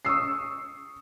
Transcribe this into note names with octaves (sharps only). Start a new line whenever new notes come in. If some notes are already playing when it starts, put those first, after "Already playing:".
C#6 D#6 E6 C7